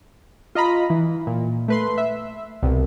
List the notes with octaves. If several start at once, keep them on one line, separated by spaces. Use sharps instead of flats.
F4 D#5 A#5 B5
E3
A#2
A3 B4 C6
E5
C2 B2